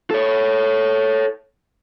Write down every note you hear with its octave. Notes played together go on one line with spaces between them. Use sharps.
A4 C#5